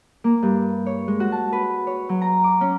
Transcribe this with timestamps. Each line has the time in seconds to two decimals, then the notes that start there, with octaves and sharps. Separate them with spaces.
0.24 A#3
0.43 G2
0.86 C#5
1.08 G#3
1.20 F#4
1.32 A5
1.53 B4
1.87 C#5
2.09 F#3
2.22 A#5
2.44 D6
2.61 C#4